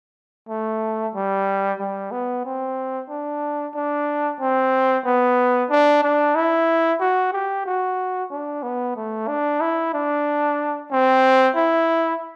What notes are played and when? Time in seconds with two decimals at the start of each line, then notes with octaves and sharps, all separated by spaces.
0.49 A3
1.15 G3
1.80 G3
2.12 B3
2.45 C4
3.09 D4
3.75 D4
4.40 C4
5.05 B3
5.70 D4
6.03 D4
6.35 E4
7.00 F#4
7.33 G4
7.66 F#4
8.31 D4
8.63 B3
8.96 A3
9.28 D4
9.61 E4
9.94 D4
10.91 C4
11.56 E4